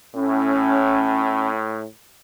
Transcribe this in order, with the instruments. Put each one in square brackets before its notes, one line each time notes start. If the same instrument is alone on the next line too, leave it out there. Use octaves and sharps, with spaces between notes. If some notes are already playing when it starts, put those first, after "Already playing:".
[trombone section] A2 [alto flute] C#4